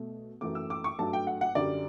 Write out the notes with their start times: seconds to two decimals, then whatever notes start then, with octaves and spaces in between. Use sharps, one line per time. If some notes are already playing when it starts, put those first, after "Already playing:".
Already playing: B2 A3
0.41 F#2 E3 A3 D6
0.55 E6
0.70 D6
0.84 C#6
0.98 G2 F#3 A3 A5
1.13 G5
1.27 F#5
1.41 F#5
1.55 F#2 D3 G3 D5